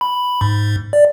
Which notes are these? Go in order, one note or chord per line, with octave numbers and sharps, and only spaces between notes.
B5
G#2
D5